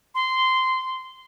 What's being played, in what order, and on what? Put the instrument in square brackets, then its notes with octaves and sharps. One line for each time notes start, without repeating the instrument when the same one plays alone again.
[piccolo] C6